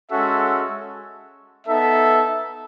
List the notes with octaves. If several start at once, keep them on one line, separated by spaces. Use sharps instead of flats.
G#3 C#4 F#4 A4 E5
B3 D#4 A4 E5